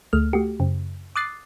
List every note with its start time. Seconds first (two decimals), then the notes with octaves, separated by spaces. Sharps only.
0.13 D2 A3 F6
0.33 A3 F#4 G4
0.60 F#2 C#3
1.16 D6 D#6 F#6 A6 C7